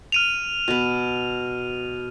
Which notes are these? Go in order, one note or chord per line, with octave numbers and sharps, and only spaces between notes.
F6 D#7 F7
B2 B4